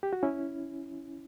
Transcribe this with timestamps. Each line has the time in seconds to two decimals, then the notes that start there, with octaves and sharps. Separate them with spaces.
0.03 G4
0.13 F#4
0.23 C#4 E4